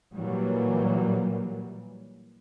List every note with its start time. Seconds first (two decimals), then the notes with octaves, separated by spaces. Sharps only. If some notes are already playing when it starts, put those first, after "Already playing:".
0.14 A#2 E3 F#3 G3 A#3